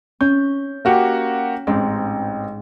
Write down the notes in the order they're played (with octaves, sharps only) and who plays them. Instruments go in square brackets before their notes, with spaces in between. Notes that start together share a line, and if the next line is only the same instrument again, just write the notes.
[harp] C#4 [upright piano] G6
[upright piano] A#3 F#4 G4
[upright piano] A1 C4 [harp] G#2